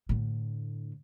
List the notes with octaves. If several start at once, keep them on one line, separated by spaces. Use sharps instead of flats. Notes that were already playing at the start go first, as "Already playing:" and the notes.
A2 D3